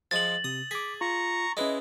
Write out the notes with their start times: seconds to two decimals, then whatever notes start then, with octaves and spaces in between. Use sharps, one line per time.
0.11 F3 G#3 A6 F#7
0.44 C3 D#6
0.71 G#4 D6 B6
1.01 F4 A#5 C#6
1.57 G#3 C#4 E4 B4 D#5